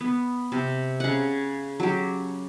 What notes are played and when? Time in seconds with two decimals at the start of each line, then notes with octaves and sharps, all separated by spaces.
0.01 B3
0.52 C3
1.00 C#3 F#5
1.80 F#3 G4